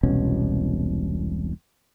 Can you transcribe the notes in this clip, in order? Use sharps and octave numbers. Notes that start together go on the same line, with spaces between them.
E1 C2 B2 C#4